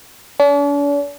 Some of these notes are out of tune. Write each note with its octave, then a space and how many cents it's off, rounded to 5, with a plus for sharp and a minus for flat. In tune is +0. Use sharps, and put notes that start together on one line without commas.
D4 -45